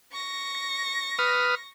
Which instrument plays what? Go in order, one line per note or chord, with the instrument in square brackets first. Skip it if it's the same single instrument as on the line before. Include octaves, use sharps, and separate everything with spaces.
[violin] C#6 A#6
[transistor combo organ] B4 D#6 F6